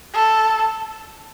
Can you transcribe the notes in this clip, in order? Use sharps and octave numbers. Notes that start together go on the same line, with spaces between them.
A4